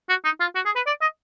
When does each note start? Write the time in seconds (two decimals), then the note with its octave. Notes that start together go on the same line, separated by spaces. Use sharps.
0.09 F#4
0.25 D#4
0.41 F4
0.55 F#4
0.66 G#4
0.76 B4
0.87 D5
1.01 D#5